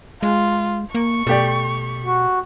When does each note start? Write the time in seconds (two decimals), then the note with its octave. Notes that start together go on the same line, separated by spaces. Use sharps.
0.23 G#3 F4
0.95 A#3 C#6
1.27 B2 A3 G4 D5
2.04 F#4